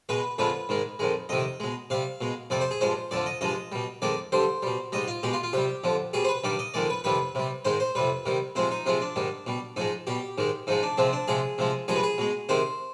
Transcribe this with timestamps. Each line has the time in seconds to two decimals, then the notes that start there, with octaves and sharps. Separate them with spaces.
0.09 B2 G#3 B4
0.38 F2 D3 F3 G#3 B4
0.69 G#2 D#3 G#3
0.99 F2 D#3 G#3
1.29 F2 C3 D#3 D#5
1.60 B2 G#3
1.90 C3 G3 F5
2.21 B2 G#3
2.50 F2 C3 G3 D5
2.61 C5
2.71 G#4
2.81 G2 F3 G#3 C5
3.11 F2 D3 F3 D5
3.26 D#5
3.41 G2 F3 G#3 D#5
3.72 B2 G3
4.02 F2 D#3 G#3 D5
4.32 G2 D3 G3 C5
4.63 B2 G3
4.92 G#2 G3 D#5
5.08 F4
5.23 B2 G#3 G4
5.33 F4
5.43 F4
5.53 C3 G3 G4
5.84 F2 D3 F3
6.13 B2 G3 G#4
6.24 C5
6.28 B4
6.44 G2 D#3 G3 D5
6.59 D#5
6.74 F2 D#3 G#3 D5
6.90 B4
7.04 F2 C3 D#3 G3 B4
7.35 C3 G3
7.65 G#2 D#3 G#3 C5
7.80 C5
7.95 F2 C3 G3 B4
8.26 C3 D#3 G3
8.55 C3 F3 G#3 C5
8.71 D#4
8.86 C3 F3 G#3 F4
9.01 D4
9.16 G#2 D#3 G3
9.46 B2 G3
9.76 G#2 F3 G#3 D#4
10.07 B2 G3 G4
10.38 G#2 D#3 G#3
10.67 G#2 F3 G#3 D#4
10.83 D4
10.98 C3 F3 G#3 C4
11.13 D4
11.28 C3 F3 G#3 G#4
11.58 C3 F3 G#3
11.88 G2 F3 G#3 G#4
11.96 B4
12.03 G#4
12.18 B2 G#3
12.49 C3 D#3 G#3 C5